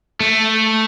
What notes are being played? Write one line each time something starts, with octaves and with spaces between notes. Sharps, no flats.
A3